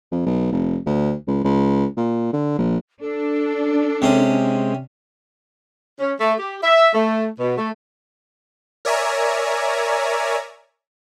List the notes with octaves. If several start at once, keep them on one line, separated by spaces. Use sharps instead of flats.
F2
B1
F1
D2
C#2
C#2
A#2
D3
A#1
D4 A4
C3 G#3 C4 C#4
C#4
A3
G4
E5
A3
B2
A3
A#4 C#5 D5 E5 G#5 A#5